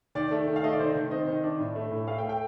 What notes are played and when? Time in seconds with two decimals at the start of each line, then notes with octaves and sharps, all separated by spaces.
0.15 D#3 D5
0.31 A3
0.47 D#3
0.56 F5
0.63 A3 D#5
0.72 D5
0.79 D#3 C5
0.95 D#3
1.11 C4 D#5
1.27 D#3
1.44 D4
1.59 A2
1.75 A3
1.91 A2
2.08 A3 F5
2.18 G5
2.23 A3
2.29 G5